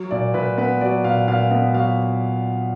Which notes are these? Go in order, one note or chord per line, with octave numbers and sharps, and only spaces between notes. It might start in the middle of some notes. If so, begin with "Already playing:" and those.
Already playing: F#3
A#2 D5
A#2 B4
B3 B4
F#3 D5
A#2 F5
A#2 F5
B3 D#5
F#3 F5